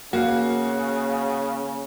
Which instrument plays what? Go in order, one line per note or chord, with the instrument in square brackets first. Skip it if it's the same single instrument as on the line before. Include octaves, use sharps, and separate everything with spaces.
[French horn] C#3 [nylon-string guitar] A#3 [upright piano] F#4 F5